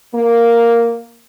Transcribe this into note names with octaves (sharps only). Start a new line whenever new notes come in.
A#3